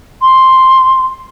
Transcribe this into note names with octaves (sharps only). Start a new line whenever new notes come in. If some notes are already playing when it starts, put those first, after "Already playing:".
C6